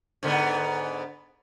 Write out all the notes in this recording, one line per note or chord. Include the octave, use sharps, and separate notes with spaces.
G#2 D3 B3